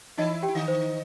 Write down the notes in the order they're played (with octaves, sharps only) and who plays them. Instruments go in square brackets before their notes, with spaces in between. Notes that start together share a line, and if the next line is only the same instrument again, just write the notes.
[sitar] E3 E4 [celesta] D#4 D#5
[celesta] G4 G5
[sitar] E4
D#3 D#4
[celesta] C5